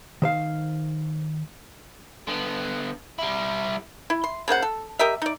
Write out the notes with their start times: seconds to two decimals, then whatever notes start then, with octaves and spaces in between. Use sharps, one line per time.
0.22 D#3 C5 F5
2.27 D3 B3
3.19 G3 E4
4.10 E4
4.24 C6
4.48 C#3 A#3 C5 F#5
4.62 A4
4.99 G4 A#4 D#5 E5
5.22 D#4 D5